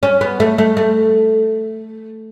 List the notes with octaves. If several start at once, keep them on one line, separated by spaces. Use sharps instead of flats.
C#4
B3
A3
A3
A3